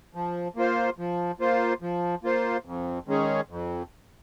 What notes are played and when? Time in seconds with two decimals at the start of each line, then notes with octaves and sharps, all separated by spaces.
0.15 F3
0.56 A#3 F4 C5
0.98 F3
1.40 A#3 F4 C5
1.82 F3
2.24 A#3 F4 C5
2.65 F2
3.08 D#3 G#3 C#4 G#4
3.49 F2